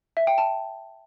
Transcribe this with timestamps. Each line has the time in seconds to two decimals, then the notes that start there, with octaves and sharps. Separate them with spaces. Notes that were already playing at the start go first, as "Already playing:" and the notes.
0.17 E5
0.27 G5
0.38 A5